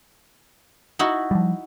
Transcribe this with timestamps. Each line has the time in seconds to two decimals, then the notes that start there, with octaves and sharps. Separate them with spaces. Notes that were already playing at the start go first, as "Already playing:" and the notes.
0.99 D#4 E4 F#4
1.31 F3 G3